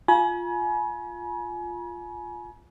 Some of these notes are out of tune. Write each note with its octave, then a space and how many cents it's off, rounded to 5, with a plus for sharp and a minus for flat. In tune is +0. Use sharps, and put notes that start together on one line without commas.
F4 +0 G#5 +30 B5 -45